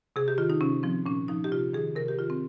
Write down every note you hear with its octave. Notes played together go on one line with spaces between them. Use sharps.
C3 G#4
G4
D#3 F4
D#4
C3 C#4
F3 C4
A#2 C#4
F3 D#4
G4
C3 F4
D#3 G#4
C3 A#4
G4
D#3 F4
C4